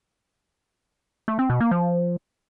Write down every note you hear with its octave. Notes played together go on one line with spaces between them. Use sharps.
A3
C4
B2
A#3
F3